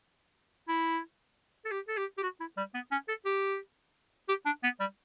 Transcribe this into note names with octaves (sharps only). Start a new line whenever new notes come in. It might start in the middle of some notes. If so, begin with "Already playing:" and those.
E4
A4
G4
A4
G4
G4
F#4
E4
G3
B3
C#4
A4
G4
G4
D4
B3
G3